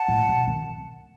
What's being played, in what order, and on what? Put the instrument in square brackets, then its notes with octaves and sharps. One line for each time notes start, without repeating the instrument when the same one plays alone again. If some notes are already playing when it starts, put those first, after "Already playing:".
Already playing: [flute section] F#5 A5
[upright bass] A2
B2
D#3